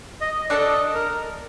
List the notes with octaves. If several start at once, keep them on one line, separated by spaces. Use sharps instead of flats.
D#5
D4 A4 D5 D#5
A#4